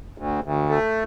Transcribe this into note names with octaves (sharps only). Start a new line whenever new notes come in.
D2
D2
A3